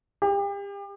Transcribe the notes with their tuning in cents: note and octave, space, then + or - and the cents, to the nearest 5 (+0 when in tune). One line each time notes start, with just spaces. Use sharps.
G4 +35